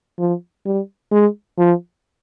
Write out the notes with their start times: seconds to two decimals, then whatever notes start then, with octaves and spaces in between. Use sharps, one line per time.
0.19 F3
0.65 G3
1.12 G#3
1.58 F3